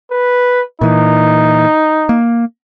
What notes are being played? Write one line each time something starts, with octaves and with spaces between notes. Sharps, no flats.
B4
A#2 E3 D#4
A#3